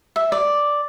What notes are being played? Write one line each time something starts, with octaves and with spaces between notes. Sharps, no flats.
E5
D5